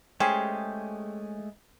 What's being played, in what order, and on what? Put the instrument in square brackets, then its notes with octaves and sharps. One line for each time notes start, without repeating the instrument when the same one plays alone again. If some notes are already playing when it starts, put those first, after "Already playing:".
[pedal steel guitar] G#3 A3 [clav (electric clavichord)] C#4 G#4 C5 [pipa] G4